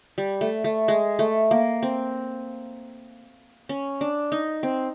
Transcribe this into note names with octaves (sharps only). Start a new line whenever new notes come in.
G3
A3
A3
G#3
A3
A#3
C4
C#4
D4
D#4
C4